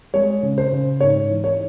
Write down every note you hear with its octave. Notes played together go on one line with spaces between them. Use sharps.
G#3 C#5
C#3
C5
C#3
G#2 C#5
E3
C#5